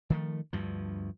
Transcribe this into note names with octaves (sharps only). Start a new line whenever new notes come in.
D#3 F3 A3
D2 G2 F3